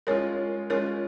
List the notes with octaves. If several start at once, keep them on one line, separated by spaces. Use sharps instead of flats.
G#3 C#4 F4 A#4 C#5
G#3 C#4 F4 A#4 C#5